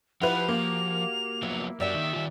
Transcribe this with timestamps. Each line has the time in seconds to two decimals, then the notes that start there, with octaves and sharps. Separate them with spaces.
0.21 F3 E4 F#4 G4 B4 F7
0.48 A#3
1.43 F3 F#3 B3 E4
1.80 F#2 F#3 G4 D5 E5 G5
1.95 D#3
2.13 D#3 F4